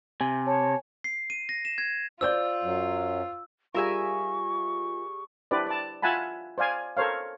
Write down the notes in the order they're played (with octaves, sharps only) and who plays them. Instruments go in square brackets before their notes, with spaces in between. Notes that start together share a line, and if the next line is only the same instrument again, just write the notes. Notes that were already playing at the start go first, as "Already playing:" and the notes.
[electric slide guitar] C3 [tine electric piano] G#5
[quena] C#5 [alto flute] A5
[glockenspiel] C7
D#7
A#6
E7
G#6
[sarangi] F4 [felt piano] C5 D5 G6 [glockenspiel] E6
[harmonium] F#2 F#3
[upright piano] G3 G#4 [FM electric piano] F4 [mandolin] A#4 E5 G#5 [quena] C#6
[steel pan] D4 E4 G4 B4 C5 D5
D5 A5
F4 E5 F#5 G#5 A5 B5
C5 D5 F5 G#5
A4 A#4 C5 C#5 F5